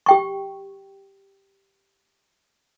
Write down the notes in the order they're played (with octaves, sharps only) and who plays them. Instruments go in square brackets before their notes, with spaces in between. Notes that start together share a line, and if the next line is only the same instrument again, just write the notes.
[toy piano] G4 G5 C#6